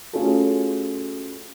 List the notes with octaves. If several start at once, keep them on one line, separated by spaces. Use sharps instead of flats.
A3 C#4 F4 F#4 G#4 A4